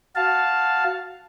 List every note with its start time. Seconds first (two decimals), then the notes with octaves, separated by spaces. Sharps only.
0.16 F#4 F5 A5